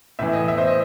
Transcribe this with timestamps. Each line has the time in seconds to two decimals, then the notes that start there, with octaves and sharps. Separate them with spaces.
0.19 A2 E3 E5
0.33 D#5
0.48 E5
0.58 C5
0.67 D#5